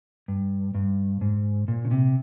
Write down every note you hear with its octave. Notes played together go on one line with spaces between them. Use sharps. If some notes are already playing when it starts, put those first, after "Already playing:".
G2
G2
G#2
A#2
C#3
C3